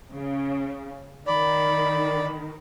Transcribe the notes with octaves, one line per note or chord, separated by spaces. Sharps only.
C#3
D#3 D5 B5